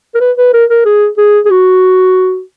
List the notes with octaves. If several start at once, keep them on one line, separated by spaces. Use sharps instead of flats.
A#4
B4
B4
A#4
A#4
G#4
G#4
G#4
F#4